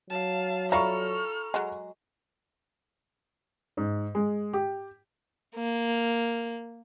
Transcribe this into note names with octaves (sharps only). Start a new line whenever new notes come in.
F#3 F5 A5
F4 A4 D5 E5 A#5 B5 C#6 F6
F#3 G#3
G#2
G#3
G4
A#3